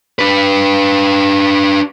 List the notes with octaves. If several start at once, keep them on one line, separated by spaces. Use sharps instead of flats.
D4 B4